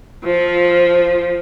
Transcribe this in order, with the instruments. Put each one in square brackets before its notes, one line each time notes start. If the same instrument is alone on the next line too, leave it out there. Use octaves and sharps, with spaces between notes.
[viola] F3